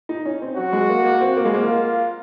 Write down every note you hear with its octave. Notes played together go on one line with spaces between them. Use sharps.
D#4
C#4
C4
F#3 F#4
G#3
A#3
A#3
C4
A#3
G#3
A#3 F4